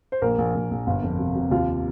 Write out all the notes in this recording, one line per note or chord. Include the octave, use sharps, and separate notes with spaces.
C5
A#1 A#3 A#4
A#1
A#1
A#1
G1
F2
C3
C3
D#2 F4 F5